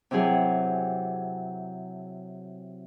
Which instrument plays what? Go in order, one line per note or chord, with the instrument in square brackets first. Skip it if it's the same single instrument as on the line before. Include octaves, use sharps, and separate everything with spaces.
[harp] C3 E3 F#3 G#4